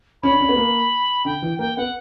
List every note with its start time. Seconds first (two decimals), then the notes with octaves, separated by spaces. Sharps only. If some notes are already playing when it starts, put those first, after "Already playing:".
0.23 C#4 B5
0.31 D4
0.41 C#4
0.49 B3
0.56 A#3
1.25 D3 G5
1.42 E3
1.59 A#3 G5
1.77 B3 F#5